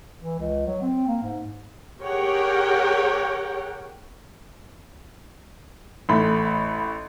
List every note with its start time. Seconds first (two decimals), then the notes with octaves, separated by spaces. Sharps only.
0.23 E3
0.40 C#2
0.66 F#3
0.82 C4
1.08 A#3
1.23 G#2
2.02 G4 G#4 A#4 C#5 F#5 G5
6.09 A1 A3 B5